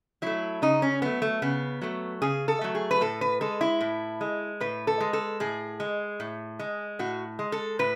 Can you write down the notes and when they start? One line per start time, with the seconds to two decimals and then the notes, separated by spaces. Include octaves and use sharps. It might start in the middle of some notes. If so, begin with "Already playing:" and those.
0.22 F#3 A3 E4
0.62 C#3 D#4
0.82 C#4
1.02 F#3 A3 B3
1.22 A3
1.42 C#3 B3
1.82 F#3 A3
2.22 C#3 G#4
2.48 A4
2.61 F#3 A3
2.75 G#4
2.91 B4
3.01 A2 A4
3.21 B4
3.41 G#3 A4
3.61 E4
3.81 A2
4.21 G#3
4.60 A2 B4
4.87 A4
5.00 G#3
5.13 A4
5.40 A2 G#4
5.80 G#3
6.20 A2
6.59 G#3
6.99 A2 F#4
7.39 G#3
7.52 A4
7.79 A2 B4